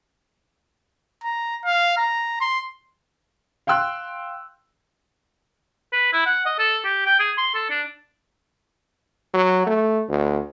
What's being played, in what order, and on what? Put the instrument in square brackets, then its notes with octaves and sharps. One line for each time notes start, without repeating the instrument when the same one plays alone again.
[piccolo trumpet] A#5
F5
A#5
C6
[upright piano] F5 G5 C6 E6 F#6
[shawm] B4
E4
F#5
D#5
A4
G4
G5
G#4
C6
A4
D4
[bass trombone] F#3
A3
D2